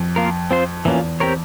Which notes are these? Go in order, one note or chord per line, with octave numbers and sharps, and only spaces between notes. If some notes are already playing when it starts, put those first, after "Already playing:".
Already playing: F2
A#3 F4 A#4
C4 F4 C5
E2 E3 A#3 C#4 F4
C4 G4 A#4 C#5